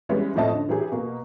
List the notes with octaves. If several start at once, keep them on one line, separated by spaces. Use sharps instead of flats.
E3 G3 G#3 B3 C#4
F2 A2 F3 A3 D#5 A5
D3
E3 F#3 G4 G#4
B2 A#3